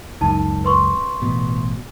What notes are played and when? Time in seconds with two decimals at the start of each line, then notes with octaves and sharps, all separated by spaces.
0.21 C#2 F#2 D#4 A5
0.64 B4 C6 C#6
1.22 A1 B2